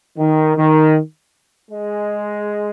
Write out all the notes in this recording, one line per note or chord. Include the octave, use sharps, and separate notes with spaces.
D#3
D#3
G#3